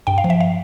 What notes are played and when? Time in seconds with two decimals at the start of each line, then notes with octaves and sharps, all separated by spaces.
0.07 G2 G5
0.18 F5
0.24 F3
0.30 E5
0.41 F5